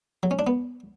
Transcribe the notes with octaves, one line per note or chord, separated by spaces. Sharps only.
F#3
C#4
D4
B3